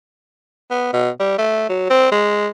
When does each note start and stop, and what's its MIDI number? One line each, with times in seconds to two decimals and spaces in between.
0.71 0.90 59
0.94 1.09 47
1.20 1.37 55
1.38 1.67 57
1.69 1.88 54
1.90 2.09 60
2.12 2.47 56